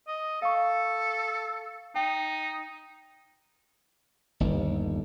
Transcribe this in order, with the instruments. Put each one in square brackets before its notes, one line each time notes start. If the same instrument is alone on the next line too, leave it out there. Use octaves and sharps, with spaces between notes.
[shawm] D#5
[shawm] A4 [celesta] F5 C#6
[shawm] D#4 [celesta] G5
[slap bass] G1 D#2